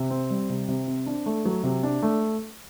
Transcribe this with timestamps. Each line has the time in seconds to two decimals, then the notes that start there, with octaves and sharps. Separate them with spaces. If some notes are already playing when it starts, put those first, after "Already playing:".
Already playing: C3
0.10 C4
0.30 G3
0.50 C3
0.68 C3
0.87 C4
1.06 D4
1.26 A3
1.45 F#3
1.63 C3
1.83 D4
2.02 A3